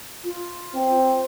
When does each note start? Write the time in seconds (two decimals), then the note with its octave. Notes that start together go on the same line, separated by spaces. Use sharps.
0.24 F4
0.75 C4